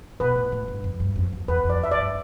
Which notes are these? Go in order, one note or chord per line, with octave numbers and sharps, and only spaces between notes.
B2 B4
A2
A2
G2
F2
G2
F2
E2
E2 B4
F2
D5
E5
D5
G2